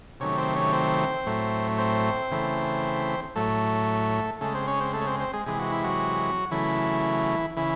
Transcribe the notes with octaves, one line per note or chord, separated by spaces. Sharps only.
C3 D#3 F#3 A3 C#4 C#5
C4 C5
C#4 C#5
C4 C5
A2 F#3 A3
C4 C5
C#3 E3 A3
A2 F#3 A3 A4
C#3 G#3 A3 A4
C4 C5
C#4 C#5
C4 C5
A3 A4
C#5
C4 C5
C4 C5
G#3 G#4
C3 E3 G#3 G#4
F#4
E4
F#3 F#4
C#3 E3 F#3 A3 E4
C#3 E3 E4